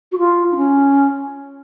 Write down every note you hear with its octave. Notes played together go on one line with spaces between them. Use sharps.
F#4
F4
D#4
C#4